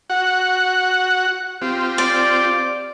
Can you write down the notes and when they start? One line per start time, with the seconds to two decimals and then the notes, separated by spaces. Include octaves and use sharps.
0.10 F#4 F#5
1.62 C4 F4 G4
1.98 D5